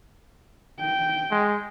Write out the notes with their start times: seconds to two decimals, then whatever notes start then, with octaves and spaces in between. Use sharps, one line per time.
0.80 G5
1.31 G#3